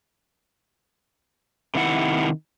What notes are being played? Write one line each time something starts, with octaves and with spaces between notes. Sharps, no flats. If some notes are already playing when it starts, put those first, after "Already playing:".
C3 D#3 E4 F#5